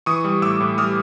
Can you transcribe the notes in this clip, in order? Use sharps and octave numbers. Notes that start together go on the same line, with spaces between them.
E3 C#6 D#6
G3
A2 D6 E6
A2
G3 D#6 F6